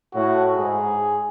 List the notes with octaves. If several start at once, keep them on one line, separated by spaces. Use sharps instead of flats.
A2 F#4
G#2 G#4